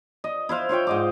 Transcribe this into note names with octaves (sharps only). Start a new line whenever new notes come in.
D#5
E4 C5 F5
F4 C#5 F5 G5
G#2 D#5 D6